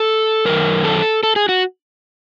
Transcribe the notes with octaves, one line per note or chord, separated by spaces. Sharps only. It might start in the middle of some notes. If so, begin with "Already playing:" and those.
Already playing: A4
F#2 D#3 A#4
A4
A4
G#4
F#4